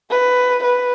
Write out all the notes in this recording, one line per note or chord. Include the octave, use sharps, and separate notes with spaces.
B4
B4